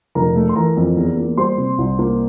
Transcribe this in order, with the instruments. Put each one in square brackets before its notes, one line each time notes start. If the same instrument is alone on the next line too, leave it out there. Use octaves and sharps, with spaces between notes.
[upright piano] F1 A#4 A#5
A3
C6
E3 A#4 A#5
F2
E2
A#3
G3 C5 C6
C3
C2
A#3